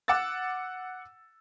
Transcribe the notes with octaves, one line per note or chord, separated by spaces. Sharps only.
F#5 D6 E6 A6